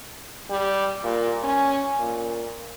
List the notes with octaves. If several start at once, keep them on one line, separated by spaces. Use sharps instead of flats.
G3
A#2
C#4
A#2